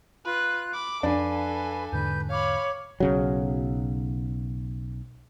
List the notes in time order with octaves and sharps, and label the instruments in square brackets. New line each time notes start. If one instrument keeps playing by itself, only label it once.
[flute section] F4 F#6 [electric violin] B4
[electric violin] B5 D6
[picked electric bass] F2 [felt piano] D4 [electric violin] A4 G#5 [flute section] B4 F5
[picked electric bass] E2 G#2 D3 [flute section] B4 G6
[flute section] C#5 D6 [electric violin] F5 B5
[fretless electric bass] B1 C#3 F#3